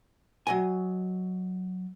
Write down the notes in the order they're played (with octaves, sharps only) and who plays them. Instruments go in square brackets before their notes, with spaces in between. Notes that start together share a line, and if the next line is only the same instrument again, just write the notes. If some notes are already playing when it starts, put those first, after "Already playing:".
[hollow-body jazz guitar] F#3 D#5 G#5